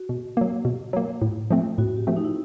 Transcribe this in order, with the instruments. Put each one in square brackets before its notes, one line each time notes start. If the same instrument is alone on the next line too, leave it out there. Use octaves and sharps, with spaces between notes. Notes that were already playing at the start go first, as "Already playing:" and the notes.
Already playing: [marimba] F#4
[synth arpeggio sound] B2
F#3 A#3
B2
F#3 A#3
A2
F3 A3 C4
[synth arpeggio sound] A2 [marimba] F#4
[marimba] G4
[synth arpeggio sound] F3 A3 C4
[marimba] D#4
E4